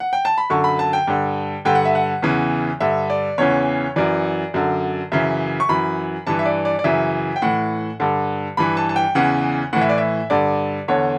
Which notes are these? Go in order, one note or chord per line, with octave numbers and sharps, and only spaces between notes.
F#5
G5
A5
B5
F#2 D3 C#6
B5
A5
G5
G2 D3
G2 D3 G5
F#5
E5
F#5
E2 C#3 E3
G2 D3 E5
D5
E2 C#3 E3 C#5
F#2 E3 D5
F#2 D3
F#2 C#3 E3 E5
C#6
F#2 E3 B5
G2 E3 A5
E5
D5
D5
D5
F#2 C#3 E3 E5
G5
A2 E3 F#5
G2 D3
G2 E3 B5
A5
A5
G5
E2 C#3 E3 F#5
A2 E3 F#5
E5
D5
E5
G2 D3 D5
E2 D3 C#5